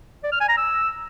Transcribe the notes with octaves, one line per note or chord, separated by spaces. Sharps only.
D5
F6
G#5
A#5
E6